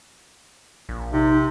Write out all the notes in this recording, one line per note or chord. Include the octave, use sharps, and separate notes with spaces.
A#1
C3 D#4